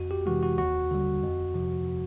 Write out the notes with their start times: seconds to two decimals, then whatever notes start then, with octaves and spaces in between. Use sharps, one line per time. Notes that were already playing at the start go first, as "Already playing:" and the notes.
Already playing: F2 F#4
0.11 G4
0.26 C3 E3 G#3 F#4
0.43 F#4
0.58 D#2 F#4
0.91 D3 G3
1.23 F2
1.54 C3 F3